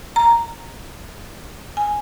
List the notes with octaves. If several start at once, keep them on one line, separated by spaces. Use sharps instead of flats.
A#5
G#5